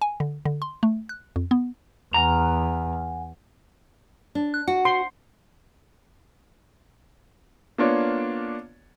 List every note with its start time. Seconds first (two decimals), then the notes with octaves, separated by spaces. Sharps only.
0.02 G#5
0.20 D3
0.45 D3
0.62 C6
0.83 A3
1.09 F#6
1.36 F2
1.51 B3
2.14 E2 F#5 G#5 A#5
4.35 D4
4.54 F#6
4.68 F#4 F#5
4.85 C6
7.78 A#3 B3 D4 F4 C#5 D5